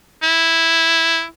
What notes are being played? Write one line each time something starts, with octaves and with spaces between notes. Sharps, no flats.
E4